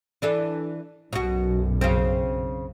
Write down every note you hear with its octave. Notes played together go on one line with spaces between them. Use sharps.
E3 D4 A4
B1 F#2 B2 F#4
C#3 C4